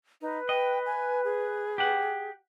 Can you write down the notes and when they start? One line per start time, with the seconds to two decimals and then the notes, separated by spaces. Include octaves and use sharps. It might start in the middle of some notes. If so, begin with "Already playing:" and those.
0.21 D#4 B4
0.49 D#5 G5
0.86 G#5
1.24 G#4
1.78 G4 F#5